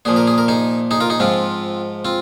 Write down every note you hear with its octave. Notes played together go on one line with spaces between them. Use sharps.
A#2 F3 G#4
A#4
G#4
A#4
D#4 G#4
D#4 G#4
F4 A#4
D#4 G#4
G#2 F3 C4 F4
C4 F4